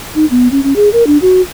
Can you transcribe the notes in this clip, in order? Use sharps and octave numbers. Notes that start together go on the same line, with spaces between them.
D#4
B3
C#4
C#4
G#4
A#4
D4
F#4